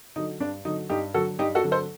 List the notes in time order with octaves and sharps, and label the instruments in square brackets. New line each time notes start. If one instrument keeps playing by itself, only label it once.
[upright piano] D3 F#3 D#4
G2 D4
D3 F#3 D#4
G2 D#4 G4
D3 F#3 F#4 A4
G2 D#4 G4
F#4 A4
D3 F#3
A4 C5